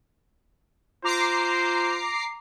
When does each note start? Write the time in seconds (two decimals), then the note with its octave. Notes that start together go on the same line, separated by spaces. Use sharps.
1.04 F4 C5 A#5 D6 C7